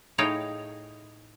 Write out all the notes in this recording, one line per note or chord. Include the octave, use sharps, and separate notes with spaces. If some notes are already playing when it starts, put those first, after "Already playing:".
A2 D#4 G#4 C#5 F5 G5